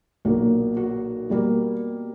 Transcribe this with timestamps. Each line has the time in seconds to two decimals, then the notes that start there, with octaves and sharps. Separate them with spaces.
0.25 B1 A#2 A#3 F#4
0.77 F#4
1.30 B2 G3 A#3